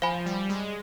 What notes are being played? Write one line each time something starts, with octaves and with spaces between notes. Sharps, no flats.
F3 C5 F5 G#5 B5
G3
G#3